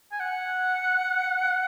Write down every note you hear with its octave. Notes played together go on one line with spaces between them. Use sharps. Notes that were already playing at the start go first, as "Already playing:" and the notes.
G#5
F#5